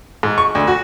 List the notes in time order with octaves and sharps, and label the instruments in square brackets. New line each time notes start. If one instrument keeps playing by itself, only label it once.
[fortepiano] G#2
C#6
D2
F#4